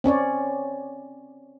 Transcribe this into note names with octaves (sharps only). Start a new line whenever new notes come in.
C4 C#4 C#5 D5